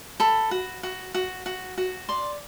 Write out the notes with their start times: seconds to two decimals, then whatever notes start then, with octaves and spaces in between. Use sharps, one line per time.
0.20 A4 B5
0.51 F#4
0.83 F#4
1.14 F#4
1.46 F#4
1.78 F#4
2.09 D5 C6